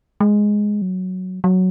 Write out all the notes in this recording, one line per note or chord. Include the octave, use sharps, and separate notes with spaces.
G#3
F#3
F#3